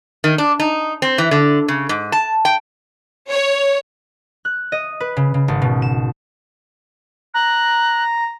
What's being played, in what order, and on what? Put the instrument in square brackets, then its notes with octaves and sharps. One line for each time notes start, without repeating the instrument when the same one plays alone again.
[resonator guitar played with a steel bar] D#3
D4
D#4
C4
E3
D3
C#3
G#2
A5
G5
[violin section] C#5
[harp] F#6
D#5
B4
C#3
C#3
G#1
B2
E7
[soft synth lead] A#5 [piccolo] F#6